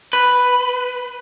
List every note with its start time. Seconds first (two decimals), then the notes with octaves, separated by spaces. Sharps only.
0.13 B4